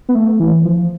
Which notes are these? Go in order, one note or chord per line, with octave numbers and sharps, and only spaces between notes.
B3
A3
E3
F3